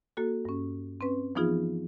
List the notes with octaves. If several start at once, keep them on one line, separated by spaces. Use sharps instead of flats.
A#3 F#4 A4
G2 C#4
C4 C#4 B4
E3 F3 B3 D#4 F4 G#4